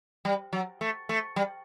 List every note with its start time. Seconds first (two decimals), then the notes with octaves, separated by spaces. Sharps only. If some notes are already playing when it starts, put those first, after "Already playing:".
0.25 G3
0.53 F#3
0.81 A3
1.09 A3
1.36 G3